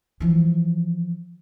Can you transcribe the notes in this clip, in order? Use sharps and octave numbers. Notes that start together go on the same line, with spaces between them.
E3 F3